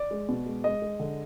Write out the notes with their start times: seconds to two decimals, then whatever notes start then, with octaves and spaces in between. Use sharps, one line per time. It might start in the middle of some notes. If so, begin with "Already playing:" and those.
Already playing: D5
0.11 G#3
0.29 B2
0.46 G#3
0.64 G#3 D#5
0.82 G#3
1.00 D3